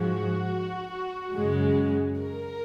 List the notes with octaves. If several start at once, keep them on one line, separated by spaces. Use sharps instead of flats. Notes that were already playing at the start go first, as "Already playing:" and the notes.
Already playing: G#2 F3 G#3 F#4
F#2 C#3 G#3
A#4